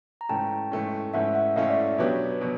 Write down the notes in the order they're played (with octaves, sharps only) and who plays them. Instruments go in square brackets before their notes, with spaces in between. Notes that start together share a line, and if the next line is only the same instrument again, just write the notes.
[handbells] A#5
[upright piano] G#2 E3 A3 C#4 [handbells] G5 A5
[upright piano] G#2 E3 A3 C#4
[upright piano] G#2 E3 A3 C#4 [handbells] E5 F#5
[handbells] E5 F#5
[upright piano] G#2 E3 A3 C#4 [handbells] D#5 F5
[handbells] D5 E5
[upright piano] B2 F#3 B3 D4 G4 [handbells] B4 C#5
[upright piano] B2 F#3